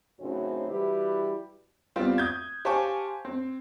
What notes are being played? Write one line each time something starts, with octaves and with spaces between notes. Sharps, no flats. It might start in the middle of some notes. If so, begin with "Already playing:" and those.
F#2 A2 C#3 F#3 C4 D#4
E3 G3 E4 F#4 G4 B4
G3 B3 C4 F4
D#6 G6 G#6
G4 C5 F5 G#5 A5 C#6
C4